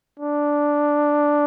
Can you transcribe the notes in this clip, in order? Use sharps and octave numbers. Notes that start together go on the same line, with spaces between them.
D4